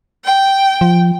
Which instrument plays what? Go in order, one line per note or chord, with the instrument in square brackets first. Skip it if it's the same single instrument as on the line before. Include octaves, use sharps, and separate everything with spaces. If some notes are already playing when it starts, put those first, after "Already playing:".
[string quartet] G5
[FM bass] F3